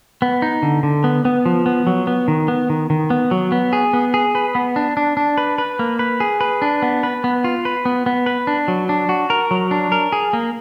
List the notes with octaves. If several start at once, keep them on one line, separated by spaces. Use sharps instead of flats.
B3
D#4
D3
D3
B3
B3
F3
B3
F#3
B3
D#3
B3
D#3
D#3
B3
F#3
B3
G#4
B3
G#4
B4
B3
D4
D4
D4
B4
B4
A#3
B4
G#4
B4
D4
B3
B4
B3
F4
B4
B3
B3
B4
D4
F#3
D4
F#4
A#4
F#3
D4
A#4
G#4
A#3